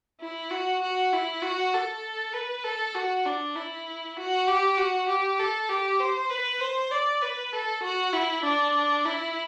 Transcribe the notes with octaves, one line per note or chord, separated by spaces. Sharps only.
E4
F#4
F#4
E4
F#4
A4
B4
A4
F#4
D4
E4
F#4
G4
F#4
G4
A4
G4
C5
B4
C5
D5
B4
A4
F#4
E4
D4
E4